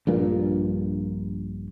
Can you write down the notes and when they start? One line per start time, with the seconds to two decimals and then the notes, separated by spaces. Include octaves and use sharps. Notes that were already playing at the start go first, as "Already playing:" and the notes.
0.07 A#1 G2 A#2